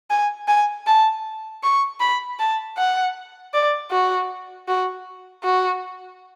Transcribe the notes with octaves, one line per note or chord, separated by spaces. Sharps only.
G#5
G#5
A5
C#6
B5
A5
F#5
D5
F#4
F#4
F#4